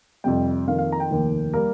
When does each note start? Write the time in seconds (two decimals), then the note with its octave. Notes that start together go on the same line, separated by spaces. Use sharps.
0.24 F2 C3 G3 G5
0.67 F2 D#3 A#3 F5
0.78 F5
0.92 A#5
1.00 G5
1.11 F1 D#2 D#3
1.54 G3 A#3 A#4